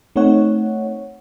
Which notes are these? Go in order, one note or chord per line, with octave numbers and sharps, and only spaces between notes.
A3 C4 D#4 C#5 F#5